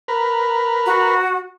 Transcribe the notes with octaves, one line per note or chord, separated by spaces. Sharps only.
A#4 B4
F#4